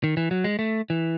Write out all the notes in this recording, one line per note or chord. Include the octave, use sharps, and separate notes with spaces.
D#3
E3
F#3
G#3
A3
E3